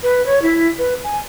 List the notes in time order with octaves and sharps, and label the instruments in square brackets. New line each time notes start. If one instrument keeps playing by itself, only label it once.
[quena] B4
C#5
E4
B4
G#5